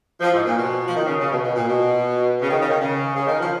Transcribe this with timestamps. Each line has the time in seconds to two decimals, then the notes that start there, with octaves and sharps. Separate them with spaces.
0.21 F3
0.33 G#2
0.46 A#2
0.58 B2
0.88 F3
0.95 D#3
1.07 C#3
1.19 C#3
1.32 B2
1.43 B2
1.55 A#2
1.68 B2
2.41 C#3
2.50 D#3
2.60 C#3
2.69 D#3
2.80 C#3
3.16 C#3
3.27 D#3
3.40 F3